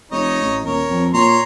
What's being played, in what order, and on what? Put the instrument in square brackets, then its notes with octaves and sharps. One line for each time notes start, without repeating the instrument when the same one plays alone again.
[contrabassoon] F1 [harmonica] D#4 C#5 D#5
[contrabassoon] A1
[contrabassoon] D#1 [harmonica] A#4 C#5
[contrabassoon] F2
[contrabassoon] A#2 [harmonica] C#5 A#5 C6